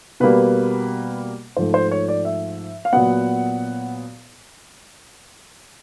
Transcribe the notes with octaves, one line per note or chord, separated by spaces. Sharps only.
B2 G3 A#3 B4
G#2 F3 A3 C5
C5
C#5
D5
E5
F5
A#2 F#3 B3 F#5